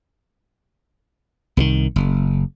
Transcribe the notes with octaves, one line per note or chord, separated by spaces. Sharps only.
C2 D3 D#3
F#1